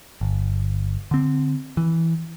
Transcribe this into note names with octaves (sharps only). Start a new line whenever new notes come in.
G1
D3 C4
E3